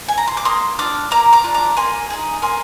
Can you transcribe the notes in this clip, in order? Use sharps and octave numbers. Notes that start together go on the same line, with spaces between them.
G#5
A#5
C6
D6
A#3 C6 D#6
D4 F4 D6 F6
A#3 A#5 D6
A#5 D6
D4 F4
A#5 D6
A#3 G#5 C6
D#4 G#4
A#3 G#5 C6